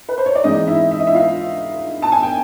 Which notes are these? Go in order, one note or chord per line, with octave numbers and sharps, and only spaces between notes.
B4
C5
C#5
D5
G#2 E3 G#3 C4 D#4 D#5
E4 E5
E5
D#5
E4 E5
F4 F5
A5
G#5
G5